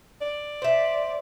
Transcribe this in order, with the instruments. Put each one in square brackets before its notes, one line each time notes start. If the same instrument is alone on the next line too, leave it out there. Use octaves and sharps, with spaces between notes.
[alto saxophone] D5
[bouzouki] C5 E5